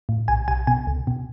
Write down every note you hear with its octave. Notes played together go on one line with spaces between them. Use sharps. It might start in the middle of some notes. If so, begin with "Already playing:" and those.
A2
B1 G#5
B1 G#5
B2 G#5
C#2
B2